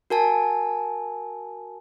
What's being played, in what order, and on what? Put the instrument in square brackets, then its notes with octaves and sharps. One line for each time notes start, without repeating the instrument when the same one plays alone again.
[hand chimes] F#4 A#4 G#5 A5